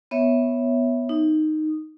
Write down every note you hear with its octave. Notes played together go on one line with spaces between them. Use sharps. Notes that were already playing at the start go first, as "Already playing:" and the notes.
B3 C#5 E5
D#4